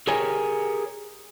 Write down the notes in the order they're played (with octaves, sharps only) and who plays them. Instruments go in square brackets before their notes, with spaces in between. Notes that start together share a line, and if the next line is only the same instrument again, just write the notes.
[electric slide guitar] G4 G#4 A#4 C#5 G#5